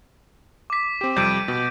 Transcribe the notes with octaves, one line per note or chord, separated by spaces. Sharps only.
D6 B6
C4 G4
F2 C3 G3 G6 D7 D#7
B2